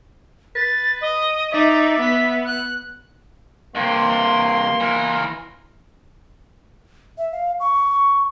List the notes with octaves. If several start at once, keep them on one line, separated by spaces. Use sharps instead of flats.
B4 A6
D#5
D#4 D5 E5
B3 B6
F#6
G2 C3 A#3 C6
E3 A#4
E5
F5
C#6